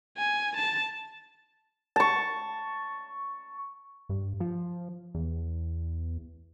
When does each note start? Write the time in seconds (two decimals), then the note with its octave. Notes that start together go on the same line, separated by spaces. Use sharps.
0.18 G#5
0.57 A5
1.96 A5 C#6
4.09 G2
4.40 F3
5.15 E2